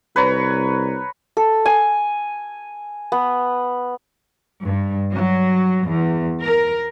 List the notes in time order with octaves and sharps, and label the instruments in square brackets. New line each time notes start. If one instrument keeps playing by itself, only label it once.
[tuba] C2 [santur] B4 C#5 A#5
[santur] A4
G#5
B3
[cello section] G2
F#3
E2
A#4